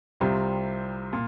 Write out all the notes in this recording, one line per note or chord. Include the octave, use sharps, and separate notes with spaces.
C2 C3 G3 C4 F4
A#2